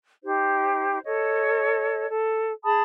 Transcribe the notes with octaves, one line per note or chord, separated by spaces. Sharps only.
D#4 G4 C5
A4 C#5 D#5
A4
G#4 A5 B5 D#6